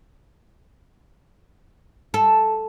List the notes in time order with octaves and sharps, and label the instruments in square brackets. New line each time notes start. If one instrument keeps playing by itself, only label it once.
[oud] A4